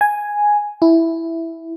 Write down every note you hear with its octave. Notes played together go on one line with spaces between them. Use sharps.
G#5
E4